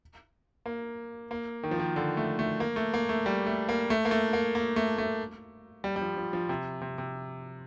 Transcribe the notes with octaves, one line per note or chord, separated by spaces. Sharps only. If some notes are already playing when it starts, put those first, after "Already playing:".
A#3
A#3
D#3
F3
D#3
D3
A3
A3
A#3
A3
A#3
A3
G3
A3
A#3
A3
A#3
A3
A#3
A#3
A3
A3
G3
G3
F3
F3
F3
C3
C3
C3